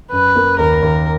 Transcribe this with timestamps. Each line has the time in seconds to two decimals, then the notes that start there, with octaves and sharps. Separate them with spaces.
0.12 F#2 B4
0.36 A#3
0.59 D#2 A#4
0.83 D#2